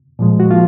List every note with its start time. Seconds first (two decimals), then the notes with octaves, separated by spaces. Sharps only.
0.19 A#2 F3 G#3
0.40 F#4
0.51 F3 A#3 F4